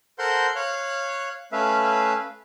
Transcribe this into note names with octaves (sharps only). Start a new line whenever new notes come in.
A4 A#4 C5 F#5 C6 G6
C#5 F5 F#6
A3 C#4 B4 E5 F5